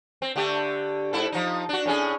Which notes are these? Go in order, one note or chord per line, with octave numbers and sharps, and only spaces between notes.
C4
D3 A3 G4
G#2 E4 A4
F3 D#4
D4 F#4
A2 C#4 G#4